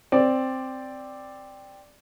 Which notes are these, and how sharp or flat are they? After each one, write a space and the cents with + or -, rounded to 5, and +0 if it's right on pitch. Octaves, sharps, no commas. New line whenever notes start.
C4 +0 D5 +0